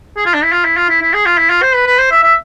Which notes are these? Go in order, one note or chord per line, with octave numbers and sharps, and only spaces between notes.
G#4
F4
D4
E4
F4
E4
F4
E4
E4
G#4
F4
E4
F4
C5
B4
B4
C5
E5
E5